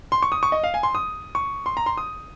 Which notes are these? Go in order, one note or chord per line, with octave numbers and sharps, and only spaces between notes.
C6
C#6
D#6
C#6
D#5
F5
G#5
C6
D#6
C#6
C6
A#5
C6
D#6